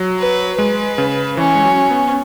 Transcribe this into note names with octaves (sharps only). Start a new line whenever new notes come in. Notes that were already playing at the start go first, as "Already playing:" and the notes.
Already playing: F#3
B4
G#3 B4
C#3
E3 C#4
G#3
F#3
B3